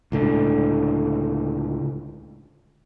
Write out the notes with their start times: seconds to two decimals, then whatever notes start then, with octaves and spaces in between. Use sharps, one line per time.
0.12 C#2 A2 D3